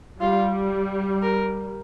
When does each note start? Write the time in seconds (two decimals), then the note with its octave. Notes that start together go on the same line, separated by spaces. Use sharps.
0.21 G3 F4
1.22 A#4